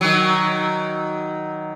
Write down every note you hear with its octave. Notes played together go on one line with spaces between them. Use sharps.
D#3 F#3